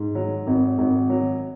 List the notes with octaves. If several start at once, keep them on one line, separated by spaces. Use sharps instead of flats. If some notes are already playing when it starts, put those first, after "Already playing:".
Already playing: G#2
F#3
G#1
G#1
F#3